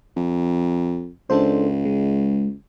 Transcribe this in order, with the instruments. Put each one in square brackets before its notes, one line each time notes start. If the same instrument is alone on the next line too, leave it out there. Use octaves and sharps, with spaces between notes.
[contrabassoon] F2
[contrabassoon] C#2 [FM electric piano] D4 A4 C5
[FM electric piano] G#3